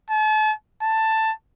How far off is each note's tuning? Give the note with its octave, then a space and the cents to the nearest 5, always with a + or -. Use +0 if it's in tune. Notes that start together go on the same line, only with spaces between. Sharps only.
A5 -40
A5 +10